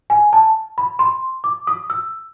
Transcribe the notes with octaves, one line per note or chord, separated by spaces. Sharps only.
G#5
A5
B5
C6
D6
D#6
E6